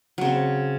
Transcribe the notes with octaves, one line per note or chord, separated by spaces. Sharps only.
C#3 F#3 C4